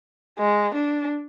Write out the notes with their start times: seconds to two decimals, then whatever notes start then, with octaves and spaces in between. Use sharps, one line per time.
0.39 G#3
0.75 D4